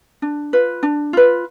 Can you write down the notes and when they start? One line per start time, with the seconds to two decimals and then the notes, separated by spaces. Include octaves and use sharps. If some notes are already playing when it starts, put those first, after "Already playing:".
0.22 D4
0.53 F4 B4
0.83 D4
1.13 F4 B4